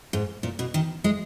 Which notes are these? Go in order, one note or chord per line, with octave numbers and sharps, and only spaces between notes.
G#2
A#2
B2
D#3
G#3